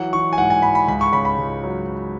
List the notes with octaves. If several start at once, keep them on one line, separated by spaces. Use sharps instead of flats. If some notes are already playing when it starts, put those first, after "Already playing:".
Already playing: E3 F#3 F#5
E3 C#6
G#5
G#2 F#5
G#5
G#2 B5
B5
C#2 B5
C#6
C#3 B5
B5
C#2
F#3